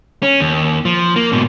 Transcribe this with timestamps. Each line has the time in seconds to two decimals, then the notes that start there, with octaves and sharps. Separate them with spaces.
0.23 C#4
0.40 D#2
0.85 F3
1.16 A#3
1.32 G#2 B2